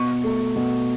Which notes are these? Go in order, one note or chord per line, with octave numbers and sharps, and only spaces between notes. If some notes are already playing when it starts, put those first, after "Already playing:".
Already playing: B2 C#6
A3
B2